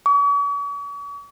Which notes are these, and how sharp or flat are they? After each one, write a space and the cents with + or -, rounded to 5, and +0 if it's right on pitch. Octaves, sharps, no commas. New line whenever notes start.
C#6 +45